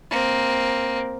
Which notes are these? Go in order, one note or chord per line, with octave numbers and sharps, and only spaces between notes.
A#3 C4